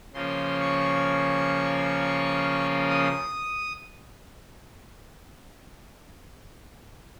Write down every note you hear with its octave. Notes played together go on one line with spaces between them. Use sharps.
C#3 F3 A#3 C#4 C6
C#6
D#6